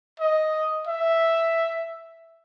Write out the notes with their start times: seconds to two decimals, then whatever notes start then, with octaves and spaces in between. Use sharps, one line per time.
0.20 D#5
0.87 E5